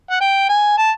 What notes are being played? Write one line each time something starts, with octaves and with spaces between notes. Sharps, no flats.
F#5
G5
G#5
A5